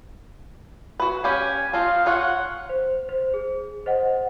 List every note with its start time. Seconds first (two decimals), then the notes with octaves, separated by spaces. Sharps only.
1.00 F#4 B4
1.24 C#4 G4 F5 G#5
1.73 F3 C4 F4 F5
2.06 F4 C#5 F5 F#5
2.69 C5
3.09 C5
3.34 G#4
3.86 C5 D#5 F#5